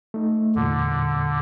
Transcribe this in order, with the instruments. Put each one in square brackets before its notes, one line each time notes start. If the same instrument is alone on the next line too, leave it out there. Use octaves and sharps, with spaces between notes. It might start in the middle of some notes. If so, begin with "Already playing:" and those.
[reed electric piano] A3 D#4
[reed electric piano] E2 G2 A#2 [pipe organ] D3